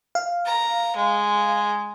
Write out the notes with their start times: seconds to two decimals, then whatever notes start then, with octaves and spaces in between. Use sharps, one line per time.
0.15 F5
0.45 A#5
0.96 G#3